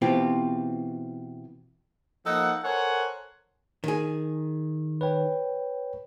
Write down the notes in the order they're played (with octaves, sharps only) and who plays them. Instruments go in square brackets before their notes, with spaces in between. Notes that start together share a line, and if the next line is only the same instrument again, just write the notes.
[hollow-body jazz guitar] B2 E3 C4 F4 G4
[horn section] F3 A#3 D#4 A4 F#5
A4 A#4 C5 C#5 F#5 G#5
[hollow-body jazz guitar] D#3 G#4
[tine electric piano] B4 C#5 G5